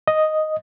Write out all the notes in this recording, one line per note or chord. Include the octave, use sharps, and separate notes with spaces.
D#5